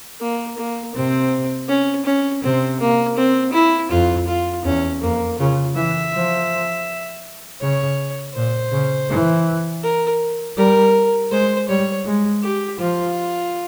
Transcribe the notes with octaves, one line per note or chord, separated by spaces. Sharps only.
A#3
A#3
C3 C4
C#4
C#4
C3 C4
A#3
C4
E4
F2 F4
F4
E2 C#4
F2 A#3
C#3 F4
E3 E5
F3
C#3 C#5
A#2 C5
C#3
E3
A#4
G3 A#4
G#3 C5
G3 C#5
G#3
G4
F3 F4